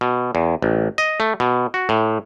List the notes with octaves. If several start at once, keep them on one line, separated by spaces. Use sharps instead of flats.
B2
E2
A1
D#5
A3
B2
F#4
A2